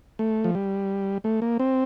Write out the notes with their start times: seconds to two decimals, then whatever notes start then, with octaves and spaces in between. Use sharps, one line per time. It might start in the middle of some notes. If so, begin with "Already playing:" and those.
0.19 A3
0.44 F3
0.55 G3
1.24 A3
1.42 A#3
1.59 C4